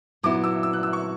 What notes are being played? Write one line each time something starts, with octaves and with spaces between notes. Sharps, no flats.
A#2 F#3 B3 E4 D6
E6
E6
F#6
E6
C#6